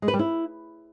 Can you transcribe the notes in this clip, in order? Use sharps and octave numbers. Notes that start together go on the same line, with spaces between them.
G#3
B4
G3
E4